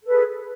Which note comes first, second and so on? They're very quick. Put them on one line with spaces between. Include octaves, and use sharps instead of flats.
A4 B4 G#4